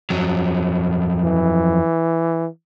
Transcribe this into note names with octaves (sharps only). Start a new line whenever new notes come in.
F2 F#3
E3